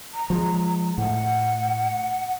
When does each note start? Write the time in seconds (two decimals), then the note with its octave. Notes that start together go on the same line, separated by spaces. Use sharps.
0.14 A#5
0.30 F3 G3 G#3
0.98 A2 F#5